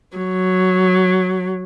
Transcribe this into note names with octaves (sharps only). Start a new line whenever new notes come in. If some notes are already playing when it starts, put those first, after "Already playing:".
F#3